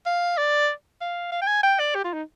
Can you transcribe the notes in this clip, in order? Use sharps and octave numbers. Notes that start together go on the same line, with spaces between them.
F5
D5
F5
F5
G5
G#5
G5
D5
G4
F4
D#4